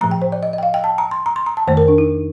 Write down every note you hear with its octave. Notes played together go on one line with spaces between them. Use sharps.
A2 F3 A3 A#5
G5
C5
D5
D#5
D#5
G5
F5
G5
A5
A#5
C6
A#5
C6
A#5
A5
F2 D#3 A3 C5
A#4
D4
D#4